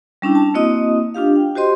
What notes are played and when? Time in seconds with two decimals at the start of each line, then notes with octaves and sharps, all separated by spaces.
0.22 G3 C#4 D4 E4
0.35 A5
0.54 A#3 C4 E4 F#4 D#5 D#6
1.14 D4 F4 G4 F5
1.36 G5
1.56 F#4 G4 C5 D#5 C6